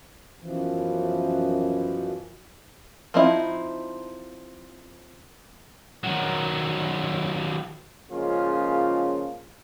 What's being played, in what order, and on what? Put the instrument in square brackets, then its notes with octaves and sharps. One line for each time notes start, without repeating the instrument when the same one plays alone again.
[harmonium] F#2 B2 E3 F3
[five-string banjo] F3 C4 D#4 E4
[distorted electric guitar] D#3 F#3
[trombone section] C#3 F3 G#3 A#3 C#4 F4